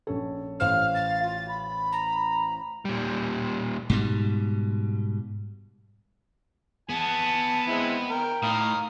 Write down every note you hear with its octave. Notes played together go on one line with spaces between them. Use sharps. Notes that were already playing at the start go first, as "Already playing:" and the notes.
A#1 C#4 A4
A1 C5 F5 F6 E7
A6
F4
B5
A#5
A#2 G3
G#2 B2 G3
B3 G#4 A5
G#3 C4 E4
A#4 G5
A2 F5 A#5 D#6